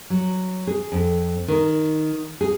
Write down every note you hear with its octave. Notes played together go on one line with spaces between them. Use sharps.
F#3
G#4
F2
D#3
G#4